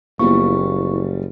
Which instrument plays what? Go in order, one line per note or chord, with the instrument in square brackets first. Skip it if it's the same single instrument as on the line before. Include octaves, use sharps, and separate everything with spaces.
[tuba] F#1 [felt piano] F3 G3 [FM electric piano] A#3 B3 E4 [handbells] C#6